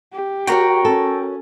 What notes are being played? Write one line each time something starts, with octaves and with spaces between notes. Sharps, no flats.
G4
F#4 A#4 C#5 G5 A#5 C#6
C#4 A4